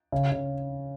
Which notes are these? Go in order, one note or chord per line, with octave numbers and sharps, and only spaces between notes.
C#3
C#3